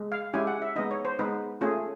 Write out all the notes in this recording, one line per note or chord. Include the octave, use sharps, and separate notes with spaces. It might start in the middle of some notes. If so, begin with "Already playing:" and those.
Already playing: G#3
F5
G#3 C#4 E4 G4 G#5
F#5
E5
G#3 B3 D#4 D#5
C#5
C5
G#3 B3 D#4 B4
A3 C#4 F4 G#4